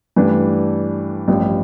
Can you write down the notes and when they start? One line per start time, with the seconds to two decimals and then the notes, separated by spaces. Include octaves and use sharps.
0.16 G2 E3 A3 D4
1.28 A1 G2 F3